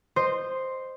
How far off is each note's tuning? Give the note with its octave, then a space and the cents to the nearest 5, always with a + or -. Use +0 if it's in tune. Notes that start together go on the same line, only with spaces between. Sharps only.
C5 +0 D#5 -15